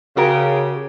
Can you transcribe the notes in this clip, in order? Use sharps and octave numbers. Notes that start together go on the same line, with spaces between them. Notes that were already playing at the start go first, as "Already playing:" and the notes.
C#3 F#4 G4 A#4